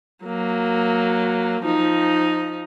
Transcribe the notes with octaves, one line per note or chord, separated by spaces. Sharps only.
F#3 A#3
F3 D#4